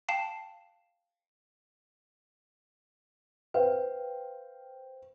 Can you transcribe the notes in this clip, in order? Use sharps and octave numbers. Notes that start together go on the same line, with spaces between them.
F5 G5 A5 C7 E7
B4 C5 F5 G5